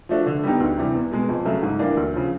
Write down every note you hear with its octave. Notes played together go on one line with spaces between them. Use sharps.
F3 A3 D4 F#4
D3
G3 B3 D#4 G4
D2
C3 E3 G3
E2
B2 G#3
F2
C#3 F#3 A3
G#2
E3 G3 A#3 D4
D2
C#3 F3